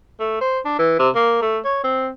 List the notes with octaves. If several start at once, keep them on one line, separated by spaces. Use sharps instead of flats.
A3
C5
D4
E3
C3
A#3
A3
C#5
C4